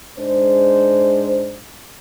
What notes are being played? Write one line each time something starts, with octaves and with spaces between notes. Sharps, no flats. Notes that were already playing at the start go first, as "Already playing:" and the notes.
G#2 G#3 D4 C5